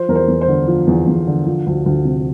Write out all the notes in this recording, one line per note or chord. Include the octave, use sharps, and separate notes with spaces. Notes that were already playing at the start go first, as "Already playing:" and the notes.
Already playing: F3 C5
E2 A#4
C5
E2
C5
D3
F3
E2
E2
D3
F3
D2
D2
C3